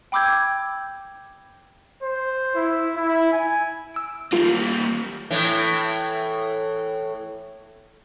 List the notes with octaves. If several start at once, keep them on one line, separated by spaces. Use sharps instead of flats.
G5 B5 D6 E6 G6 G#6
C5
E4
E4
G#5
E6 D7
G3 A#3 F4
A2 E3